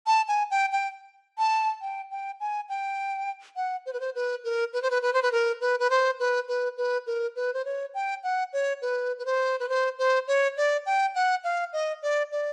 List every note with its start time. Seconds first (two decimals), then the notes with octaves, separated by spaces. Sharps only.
0.07 A5
0.28 G#5
0.51 G5
0.72 G5
1.38 A5
1.81 G5
2.11 G5
2.40 G#5
2.69 G5
3.56 F#5
3.86 C5
3.93 B4
4.00 C5
4.15 B4
4.44 A#4
4.73 B4
4.82 C5
4.91 B4
5.02 B4
5.13 C5
5.22 B4
5.32 A#4
5.61 B4
5.80 B4
5.90 C5
6.20 B4
6.48 B4
6.77 B4
7.07 A#4
7.36 B4
7.54 C5
7.65 C#5
7.94 G5
8.23 F#5
8.53 C#5
8.82 B4
9.19 B4
9.26 C5
9.60 B4
9.69 C5
9.99 C5
10.28 C#5
10.57 D5
10.86 G5
11.15 F#5
11.44 F5
11.73 D#5
12.03 D5
12.32 D5